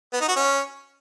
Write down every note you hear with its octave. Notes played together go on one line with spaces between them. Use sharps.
B3
D#4
F#4
C#4